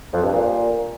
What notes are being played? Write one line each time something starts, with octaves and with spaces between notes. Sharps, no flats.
F2
G2
A#2